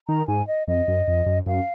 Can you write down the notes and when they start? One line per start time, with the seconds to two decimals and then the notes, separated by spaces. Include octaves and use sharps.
0.08 D#3 A#5
0.28 G#2 G#5
0.47 D#5
0.68 F2 D#5
0.88 F#2
1.08 F2
1.26 F#2
1.47 F#2 F5